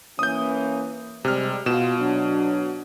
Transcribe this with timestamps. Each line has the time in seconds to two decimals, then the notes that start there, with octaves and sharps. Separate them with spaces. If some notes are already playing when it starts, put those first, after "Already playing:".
0.19 E3 A#3 C#4 D#6 G6
1.25 C3 G3 G#3 F6
1.66 B2 F4 E7
1.99 F#3 D4